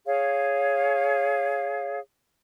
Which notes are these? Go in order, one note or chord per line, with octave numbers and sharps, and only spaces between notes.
G#4 C#5 F5